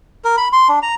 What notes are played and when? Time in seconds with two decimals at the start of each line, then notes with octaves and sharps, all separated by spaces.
0.25 A#4
0.37 B5
0.53 C6
0.69 D4
0.82 A#5